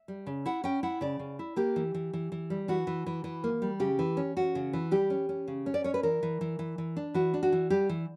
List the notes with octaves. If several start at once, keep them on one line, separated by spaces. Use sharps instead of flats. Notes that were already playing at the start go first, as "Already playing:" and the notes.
Already playing: E5
G3
C#3
E4 F#5
C#4 G5
E4 F#5
C#3 D5
C#3
E4
A#3 G4
E3
E3
E3
E3
G3
E3 F#4
E3
E3
E3
A#3
G3
C#3 G4
E3
C#4
C#4 F#4
C#3
E3
G3 G4
C#4
C#4
C#3
C#4
D5
C#4 C#5
B4
E3 A#4
E3
E3
E3
E3
D4
E3 F#4
D4
F#4
E3
G3 G4
E3